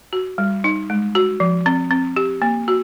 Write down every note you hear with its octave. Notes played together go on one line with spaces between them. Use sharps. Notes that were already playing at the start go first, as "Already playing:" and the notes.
F#4
G3
D#4
G#3
F#4
F3
C4
C4
G4
A#3
F#4